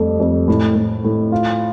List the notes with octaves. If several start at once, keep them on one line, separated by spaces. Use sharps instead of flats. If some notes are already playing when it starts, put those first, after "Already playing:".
Already playing: F2 G3 A3
F2
A2
A2
A2
F4